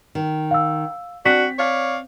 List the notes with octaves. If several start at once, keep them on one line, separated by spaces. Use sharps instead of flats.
D#3
F5 E6
C4 D4 F#4 B6
C#5 D5 F5